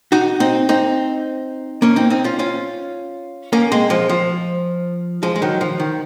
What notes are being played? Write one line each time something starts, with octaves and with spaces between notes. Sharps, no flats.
D#4 F#4
C4 D#4
C4 D#4
A#3 C#4
C4 D#4
C4 D#4
C#4 F4
C#4 F4
A#3 C#4
G#3 C4
F3 G#3
F3
F3 G#3
G#3
D#3 F#3
F3
D#3